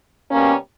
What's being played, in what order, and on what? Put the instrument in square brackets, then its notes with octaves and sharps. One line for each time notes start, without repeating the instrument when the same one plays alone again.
[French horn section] B2 G3 A#3 C#4